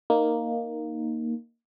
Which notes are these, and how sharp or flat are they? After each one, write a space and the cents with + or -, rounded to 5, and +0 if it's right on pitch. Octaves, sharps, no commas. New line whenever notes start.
A#3 +0 D#4 -5